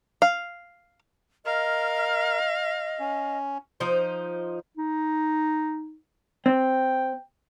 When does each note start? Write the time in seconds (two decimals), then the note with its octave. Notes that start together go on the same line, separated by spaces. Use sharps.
0.22 F5
1.46 A#4 D#5 F5
3.00 C#4
3.80 F3 D#4 C5
4.77 D#4
6.46 C4 G5